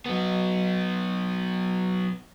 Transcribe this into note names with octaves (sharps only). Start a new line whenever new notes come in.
F#3 B3